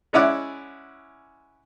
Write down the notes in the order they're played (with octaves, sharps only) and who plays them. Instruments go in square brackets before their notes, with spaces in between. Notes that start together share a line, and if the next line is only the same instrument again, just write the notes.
[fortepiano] G#3 C#4 E4 D5 F#5